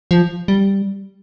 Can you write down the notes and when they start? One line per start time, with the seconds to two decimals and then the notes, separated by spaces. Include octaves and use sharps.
0.11 F3
0.48 G3